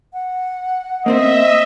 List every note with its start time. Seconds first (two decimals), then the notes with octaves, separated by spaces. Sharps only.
0.13 F#5
1.06 A#3 C4 C5 D#5 E5